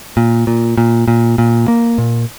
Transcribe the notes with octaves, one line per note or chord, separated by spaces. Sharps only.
A#2
A#2
A#2
A#2
A#2
A#3
A#2